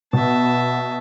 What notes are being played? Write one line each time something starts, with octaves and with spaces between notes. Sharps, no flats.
B2 B3 E5 A5